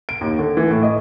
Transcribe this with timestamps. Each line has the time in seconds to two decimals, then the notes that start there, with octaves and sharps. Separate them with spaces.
0.09 D7
0.21 D#2
0.39 D3
0.57 E3
0.71 A2
0.83 D#5